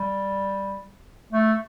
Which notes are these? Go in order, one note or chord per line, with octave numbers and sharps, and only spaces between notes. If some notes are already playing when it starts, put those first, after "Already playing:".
Already playing: G3
A3